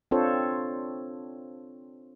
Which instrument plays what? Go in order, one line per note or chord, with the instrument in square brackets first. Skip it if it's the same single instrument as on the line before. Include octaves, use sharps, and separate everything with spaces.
[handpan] C4 D4 F4 A4 C5 C#5